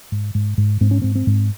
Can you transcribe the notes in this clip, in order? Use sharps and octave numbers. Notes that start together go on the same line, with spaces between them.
G#2
G#2
G#2
G#2 C4
C#4
G#2 C4
C4
G#2